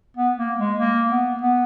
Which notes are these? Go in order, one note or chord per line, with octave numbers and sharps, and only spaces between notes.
B3
A#3
G#3
A#3
B3
B3